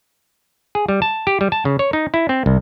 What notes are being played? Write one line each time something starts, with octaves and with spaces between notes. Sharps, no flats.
G#4
G3
A5
G4
G3
A5
C#3
C#5
D#4
E4
C4
C2